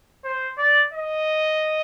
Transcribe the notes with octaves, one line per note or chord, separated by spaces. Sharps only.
C5
D5
D#5